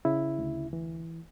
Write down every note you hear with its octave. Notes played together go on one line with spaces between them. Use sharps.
C#3 E4
D2
E3